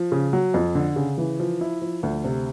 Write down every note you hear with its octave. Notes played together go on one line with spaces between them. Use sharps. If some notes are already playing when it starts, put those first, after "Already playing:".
Already playing: F3
C#3
F#3
F2
D3
C#3
E3
F3
E4
F3
D2
C3